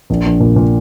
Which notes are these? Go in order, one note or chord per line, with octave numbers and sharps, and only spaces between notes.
A#1
A#1
A#2
A#2